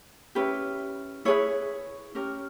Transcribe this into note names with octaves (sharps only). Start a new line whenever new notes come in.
C#4 E4 G4 B4
E4 G#4 B4 C#5
C#4 G4 A#4